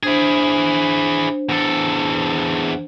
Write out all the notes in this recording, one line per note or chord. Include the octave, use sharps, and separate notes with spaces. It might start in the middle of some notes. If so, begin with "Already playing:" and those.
D4 E4 G#4 C5
E2 A4